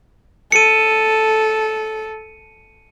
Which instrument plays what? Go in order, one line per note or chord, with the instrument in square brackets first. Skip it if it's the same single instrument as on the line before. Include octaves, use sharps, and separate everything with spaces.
[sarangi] A4 [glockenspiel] C#7 D#7